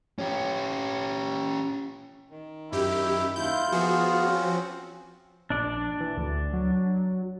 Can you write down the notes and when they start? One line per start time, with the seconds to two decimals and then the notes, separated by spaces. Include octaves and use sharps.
0.19 C#4 G4
2.30 D#3
2.72 F#2 E4 G4
3.36 D#2 E4 F4 G6
3.72 F3 B3 F#4 G#4
4.26 C4 C#4
5.50 A#1 D4 D5
6.00 E3
6.17 D2
6.53 F#3